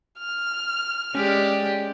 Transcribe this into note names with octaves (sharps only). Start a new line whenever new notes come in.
F6
G#3 C#4 G4 D5